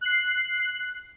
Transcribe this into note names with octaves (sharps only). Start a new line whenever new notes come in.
F#6 C7